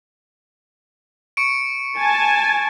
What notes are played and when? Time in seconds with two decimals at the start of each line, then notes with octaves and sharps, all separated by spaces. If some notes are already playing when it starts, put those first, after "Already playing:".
1.37 C#6 C#7 D7
1.99 G#5 A5